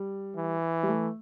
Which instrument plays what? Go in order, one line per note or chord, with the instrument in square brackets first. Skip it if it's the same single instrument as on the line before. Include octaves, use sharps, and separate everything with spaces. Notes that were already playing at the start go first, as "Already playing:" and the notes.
Already playing: [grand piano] G3
[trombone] E3
[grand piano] G3
A3